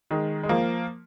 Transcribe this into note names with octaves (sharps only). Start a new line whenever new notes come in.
D#3 G#3
G#3
F3 A#3